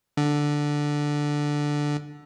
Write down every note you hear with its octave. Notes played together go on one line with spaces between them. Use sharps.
D3